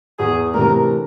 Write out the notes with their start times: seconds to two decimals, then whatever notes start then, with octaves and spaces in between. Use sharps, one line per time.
0.19 E2 G#4
0.54 C3 E3 A3 D4 A#4